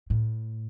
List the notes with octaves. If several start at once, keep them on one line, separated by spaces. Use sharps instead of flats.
A2